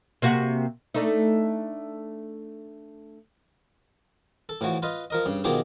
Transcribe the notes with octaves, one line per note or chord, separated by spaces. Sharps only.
C3 A#3 F#4
A3 D4 D#4
A4
A2 E3 F3 F#4
F4 B4 D#5
F3 A#4 D#5
G2 C#3
B2 D#3 F3 D#4 G4 G#4